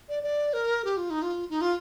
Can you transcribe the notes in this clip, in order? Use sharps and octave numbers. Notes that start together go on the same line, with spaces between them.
D5
D5
A#4
G4
F4
D#4
F4
D#4
F4